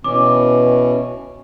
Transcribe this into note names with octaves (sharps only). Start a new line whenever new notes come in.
B2 E3 C#4 D6